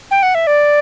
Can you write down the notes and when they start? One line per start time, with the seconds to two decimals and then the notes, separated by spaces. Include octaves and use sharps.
0.11 G5
0.23 F#5
0.35 E5
0.47 D5